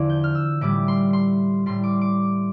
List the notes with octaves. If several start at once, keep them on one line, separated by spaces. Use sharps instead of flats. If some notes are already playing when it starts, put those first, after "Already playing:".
Already playing: E2 D3 F3 D6
G6
F6
E6
A2 E3 G3 D6
C6
C6
A2 G3 C6
D6
D6